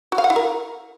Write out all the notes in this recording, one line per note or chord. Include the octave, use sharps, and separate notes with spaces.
F#4
F5
F#5
E4
A#4